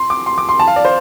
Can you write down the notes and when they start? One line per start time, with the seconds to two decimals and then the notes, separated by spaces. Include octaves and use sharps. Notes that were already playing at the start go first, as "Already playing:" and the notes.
Already playing: C6
0.10 D6
0.26 C6
0.38 D6
0.49 C6
0.60 A5
0.67 F5
0.76 D5
0.85 C5